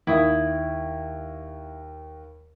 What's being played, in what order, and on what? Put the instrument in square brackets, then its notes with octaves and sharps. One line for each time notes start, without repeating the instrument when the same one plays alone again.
[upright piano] D#2 [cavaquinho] E4 D#6